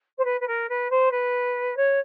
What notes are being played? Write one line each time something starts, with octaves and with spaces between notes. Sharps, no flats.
C5
B4
B4
A#4
B4
C5
B4
C#5